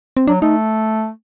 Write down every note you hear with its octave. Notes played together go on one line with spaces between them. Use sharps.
C4
F#3 D4
A3 D#4